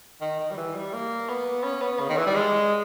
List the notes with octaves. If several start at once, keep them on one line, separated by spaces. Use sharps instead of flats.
D#3
D#3
G3
E3
G3
A#3
B3
C#4
B3
C#3
D#3
E3
G3
G#3